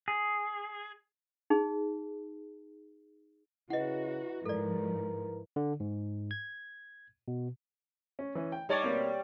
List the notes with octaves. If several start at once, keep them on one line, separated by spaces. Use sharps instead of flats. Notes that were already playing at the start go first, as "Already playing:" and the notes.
G#4
D#4 G#4
C#3 E4 F#4 B4 D#5 F#5
G#2 F3 A4 A#4 D5
D3
G#2
G#6
B2
C#4
E3 C#4
G5
G3 D#4 C#5 D5 A5 C#6
B2 A#3 C4